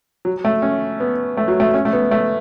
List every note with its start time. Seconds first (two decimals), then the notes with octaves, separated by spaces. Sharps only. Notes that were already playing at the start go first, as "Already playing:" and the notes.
0.25 F#3
0.45 A3
0.62 C#4
1.00 B3
1.37 A3
1.48 F#3
1.60 A3
1.74 C#4
1.85 A3
1.93 B3
2.11 A3